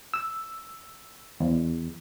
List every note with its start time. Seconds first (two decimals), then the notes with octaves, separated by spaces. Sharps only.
0.14 E6
1.40 E2